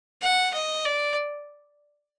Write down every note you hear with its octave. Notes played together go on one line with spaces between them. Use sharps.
F#5
D#5
D5